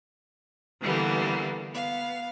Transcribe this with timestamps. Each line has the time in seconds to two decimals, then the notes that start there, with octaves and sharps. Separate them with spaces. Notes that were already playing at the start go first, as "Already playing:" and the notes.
0.81 D3 E3 G3 A#3 B3
1.72 B3 F5